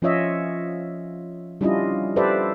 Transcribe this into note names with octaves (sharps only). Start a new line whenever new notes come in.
F3 C#4 F4 C#5 D#5 E5
G3 C#4 D4 E4 F4 D#5
G4 A4 B4 C5 D5 E5